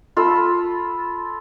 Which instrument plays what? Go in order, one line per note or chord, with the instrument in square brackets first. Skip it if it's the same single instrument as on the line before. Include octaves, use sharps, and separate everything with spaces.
[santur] F4 A4 B5